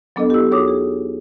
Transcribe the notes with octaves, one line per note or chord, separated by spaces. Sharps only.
F#3 B3 D4 A4 A#4 D#5
E4 G4
D#2 F#4 G#4 C#5 D6 D#6
G#4